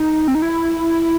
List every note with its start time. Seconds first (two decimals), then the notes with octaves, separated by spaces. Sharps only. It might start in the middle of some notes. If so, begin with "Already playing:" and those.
Already playing: D#4
0.28 C4
0.35 D#4
0.42 E4